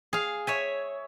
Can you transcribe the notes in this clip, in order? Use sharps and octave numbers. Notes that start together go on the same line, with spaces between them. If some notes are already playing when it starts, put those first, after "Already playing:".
G#4 F5
C#5 E5 G#5